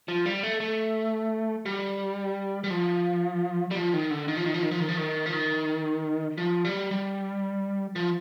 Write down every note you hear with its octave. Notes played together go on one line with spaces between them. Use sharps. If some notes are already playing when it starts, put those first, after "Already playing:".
F3
G3
A3
A3
G3
G3
F3
G3
F3
D#3
D3
D#3
F3
D#3
F3
D#3
F3
D#3
F3
D#3
F3
D#3
F3
G3
G3
F3